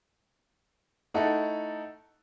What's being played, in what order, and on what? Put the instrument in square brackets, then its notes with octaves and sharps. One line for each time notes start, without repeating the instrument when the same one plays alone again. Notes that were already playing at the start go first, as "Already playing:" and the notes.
[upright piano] A3 D#4 E4 A4 F#5